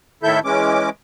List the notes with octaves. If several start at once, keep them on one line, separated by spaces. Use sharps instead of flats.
A2 D#3 E4 A4 E5 G6
E3 G#3 C#4 D6